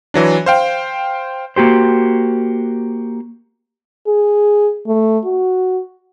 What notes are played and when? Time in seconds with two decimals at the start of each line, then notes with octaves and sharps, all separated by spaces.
0.14 E3 F#3 D4
0.46 C5 F5 G5
1.56 A#3 F#4 G4 C5
4.07 G#4
4.87 A3
5.25 F#4